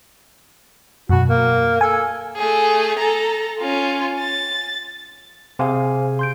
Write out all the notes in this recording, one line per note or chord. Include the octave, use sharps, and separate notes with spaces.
F#2 B2 F#4
A#3
A4 G#5
A3 G#4
A4 A#5
C#4 F4
A6
C3 G#4 C5 F5 G#5
C6 G6 D7